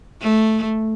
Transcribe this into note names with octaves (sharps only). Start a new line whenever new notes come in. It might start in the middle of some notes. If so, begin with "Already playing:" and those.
A3